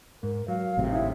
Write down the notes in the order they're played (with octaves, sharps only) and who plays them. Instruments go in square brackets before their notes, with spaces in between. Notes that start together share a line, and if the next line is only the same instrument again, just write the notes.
[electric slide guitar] G#2 [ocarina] A#4
[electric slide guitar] F#3 [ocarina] F5
[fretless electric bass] G#1 A2 C3
[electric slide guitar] D#4 E4 [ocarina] E5